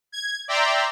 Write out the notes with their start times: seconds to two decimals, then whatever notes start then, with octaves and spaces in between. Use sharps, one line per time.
0.12 G#6
0.48 D5 E5 G5 A#5 C6